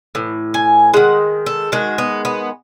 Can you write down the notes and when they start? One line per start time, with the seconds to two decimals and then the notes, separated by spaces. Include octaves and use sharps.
0.15 A2 E3
0.54 G#5
0.94 D#3 G#3 F#5
1.46 A4
1.72 D#3 G#3 F#4
1.98 B3
2.25 B3